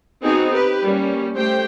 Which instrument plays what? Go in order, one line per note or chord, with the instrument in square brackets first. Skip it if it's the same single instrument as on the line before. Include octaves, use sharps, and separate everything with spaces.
[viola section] B3 C4 D#4 F#4 G#4
G4 B4
G3 A#3 C#4
A3 G4 C5 G5